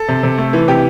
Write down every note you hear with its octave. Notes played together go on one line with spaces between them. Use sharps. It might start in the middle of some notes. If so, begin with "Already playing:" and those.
Already playing: A4
C3
C3
A3
E3
C3 G4